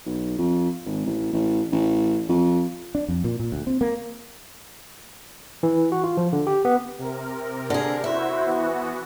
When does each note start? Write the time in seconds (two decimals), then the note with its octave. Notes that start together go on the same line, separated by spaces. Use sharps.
0.06 B1
0.38 F2
0.86 G#1
1.05 A1
1.33 A1
1.72 A1
2.29 F2
2.95 D4
3.08 F2
3.24 A#2
3.40 A#2
3.52 D2
3.67 C4
3.81 A#3
5.63 E3
5.92 F#4
6.04 F4
6.17 F3
6.33 D3
6.47 G4
6.65 B3
6.98 C3 A#4
7.70 D3 G#4
8.04 E4 F#4 C5 E5
8.44 E3 B3 F#4